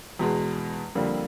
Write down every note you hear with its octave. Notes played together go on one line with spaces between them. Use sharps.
E2 B2 G#3
F2 D3 G3 A#3